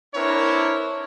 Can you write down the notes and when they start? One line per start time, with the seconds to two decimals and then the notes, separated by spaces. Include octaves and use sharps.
0.14 C4 D4 E4 A#4 B4 C#5